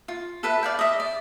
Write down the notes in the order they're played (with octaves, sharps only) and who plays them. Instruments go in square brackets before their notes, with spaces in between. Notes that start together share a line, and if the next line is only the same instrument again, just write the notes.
[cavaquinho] F4
A4 B4 E5
D5 F5 G5
D#5 E5
D5